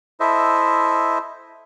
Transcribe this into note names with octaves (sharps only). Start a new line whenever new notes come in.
E4 A4 C5 D#5 E5